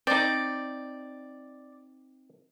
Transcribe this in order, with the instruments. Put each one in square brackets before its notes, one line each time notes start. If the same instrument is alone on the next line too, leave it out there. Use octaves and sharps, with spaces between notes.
[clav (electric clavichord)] C4 D#4 [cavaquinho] D5 D6